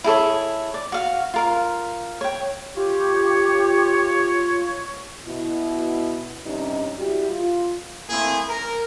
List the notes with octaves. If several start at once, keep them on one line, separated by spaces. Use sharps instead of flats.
E4 G#4 A4 C#5
D5
F#4 F5
F4 A#4 F5
C#5 G5
F4 G4 C#5
B2 E4
G2 C3 C#4 D#4
G3 E4 F#4 G4
F4
A3 A#3 C4 E4 G#4
A#4